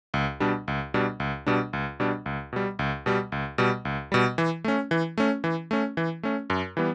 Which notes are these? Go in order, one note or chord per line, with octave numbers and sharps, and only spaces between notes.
C#2
B2 G3 D4
C#2
B2 G3 D4
C#2
B2 G3 D4
C#2
B2 G3 D4
C#2
B2 G3
C#2
B2 G3
C#2
B2 G3
C#2
B2 G3
E3
A3 C#4
E3
A3 C#4
E3
A3 C#4
E3
A3 C#4
F#2
E3 G3 B3